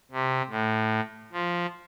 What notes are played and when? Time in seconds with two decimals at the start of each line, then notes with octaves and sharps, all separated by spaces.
0.12 C3
0.50 A2
1.32 F3